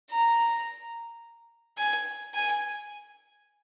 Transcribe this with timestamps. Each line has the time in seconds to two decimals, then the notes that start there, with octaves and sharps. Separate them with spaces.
0.10 A#5
1.78 G#5
2.34 G#5